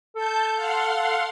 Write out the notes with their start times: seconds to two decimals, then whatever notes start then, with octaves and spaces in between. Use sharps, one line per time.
0.16 A4 A5 G6
0.55 F5 F#5 C6